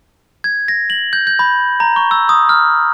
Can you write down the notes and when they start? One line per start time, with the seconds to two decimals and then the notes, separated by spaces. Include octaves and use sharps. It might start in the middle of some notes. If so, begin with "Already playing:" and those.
0.44 G#6
0.68 A#6
0.90 F#7
1.13 G6
1.27 G6
1.39 B5
1.80 A#5
1.96 C#6
2.11 E6
2.29 D#6
2.49 F6